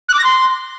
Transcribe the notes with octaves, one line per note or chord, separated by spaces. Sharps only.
F#6
D6
A#6
C6